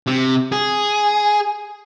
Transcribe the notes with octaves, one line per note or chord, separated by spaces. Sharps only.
C3
G#4